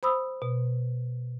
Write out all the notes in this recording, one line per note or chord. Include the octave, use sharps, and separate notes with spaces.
C5 B5 D#6 E6
B2